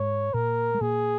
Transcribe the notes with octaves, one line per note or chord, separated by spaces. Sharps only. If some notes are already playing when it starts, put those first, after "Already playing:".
Already playing: G#2 G#3 C#5
A#2 A#3 A#4
G#3
A#2 A#3 G#4